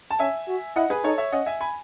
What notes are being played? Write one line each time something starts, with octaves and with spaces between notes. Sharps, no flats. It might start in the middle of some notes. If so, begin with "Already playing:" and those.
A5
C#4 E5 G#5
F#4
E4 D#5 F#5
G#4 B4
D#4 A4 C#5
C#5 E5
C#4 D#5 F#5
E5 G#5
G#5 B5